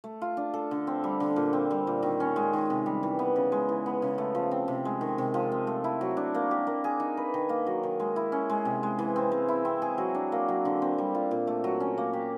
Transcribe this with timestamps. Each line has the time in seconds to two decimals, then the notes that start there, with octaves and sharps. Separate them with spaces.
0.04 A3
0.22 F4
0.37 D4
0.54 A4
0.71 D3
0.87 C4
1.04 G3
1.20 D3
1.36 A#2
1.53 C4
1.71 G3
1.87 A#2
2.03 D#3
2.20 C#4
2.36 G#3
2.53 D#3
2.70 C3
2.86 G3
3.03 E3
3.19 B3
3.36 C#3
3.52 G#3
3.69 E3
3.86 B3
4.02 C#3
4.18 A3
4.35 F3
4.51 C4
4.68 C3
4.85 G#3
5.01 D#3
5.18 C3
5.34 F3
5.52 C4
5.67 A3
5.84 E4
6.01 F#3
6.17 D4
6.35 A#3
6.51 G4
6.67 A#3
6.84 G#4
7.00 D#4
7.17 B4
7.34 D#3
7.49 A#3
7.67 F#3
7.83 D#3
8.00 G#3
8.16 E4
8.32 C#4
8.50 G#3
8.65 C3
8.83 G#3
8.99 E3
9.16 C4
9.32 G#3
9.48 E4
9.65 C4
9.82 G#4
9.98 F#3
10.15 D4
10.32 A#3
10.49 F#3
10.65 D3
10.82 C4
10.98 G3
11.15 F4
11.31 A#2
11.47 A3
11.64 F#3
11.80 C#4
11.98 A#3
12.13 G4